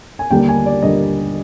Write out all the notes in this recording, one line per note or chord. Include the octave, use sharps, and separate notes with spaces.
G#5
D#2 D3 G3 A#3 D4 G5
G#5
D5
D#2 D3 G3 A#3 D4 D#5